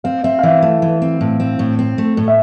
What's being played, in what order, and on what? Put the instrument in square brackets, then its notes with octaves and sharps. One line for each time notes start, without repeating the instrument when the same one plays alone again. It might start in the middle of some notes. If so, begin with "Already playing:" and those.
[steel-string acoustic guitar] C4 [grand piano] F5
[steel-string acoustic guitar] C4 [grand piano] E5
[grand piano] F5
[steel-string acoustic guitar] E3 [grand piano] E5
[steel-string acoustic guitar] A3
E3
C4
A2
C4
A2
C4
A3
A2
[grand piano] E5